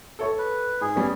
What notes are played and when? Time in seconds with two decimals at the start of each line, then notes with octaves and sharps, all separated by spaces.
0.19 A4 C#5 C#6
0.38 B4
0.81 G#2 G#4
0.96 G3 B3 C#4